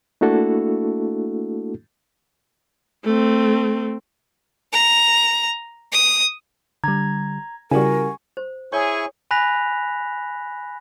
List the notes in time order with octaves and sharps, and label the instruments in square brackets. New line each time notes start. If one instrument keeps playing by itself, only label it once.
[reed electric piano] A3 A#3 D4 E4 F#4 A4
[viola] A3 C4
[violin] A#5
D#6
[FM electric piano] D3 G3 [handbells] A#5 G#6
[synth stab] C#3 G3 [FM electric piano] E4 F#4 [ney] A#4 [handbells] G#5 C#6
[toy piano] C5
[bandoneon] E4 G#5 C#6 [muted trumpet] G#4 [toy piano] C#5
[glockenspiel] G#5 B5 F#6 A#6 B6 F7